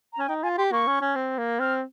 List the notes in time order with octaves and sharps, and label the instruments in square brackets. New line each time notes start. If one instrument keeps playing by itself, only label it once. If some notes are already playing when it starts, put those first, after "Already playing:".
[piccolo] A#5
[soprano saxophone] C#4 [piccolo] G#5
[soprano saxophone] D#4 [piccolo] G5
[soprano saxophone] F4 [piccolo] G#5
[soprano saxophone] G4 [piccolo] C6
[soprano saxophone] A#3 [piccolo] C#6
[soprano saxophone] C#4
C#4
C4
A#3
[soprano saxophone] C4 [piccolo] F6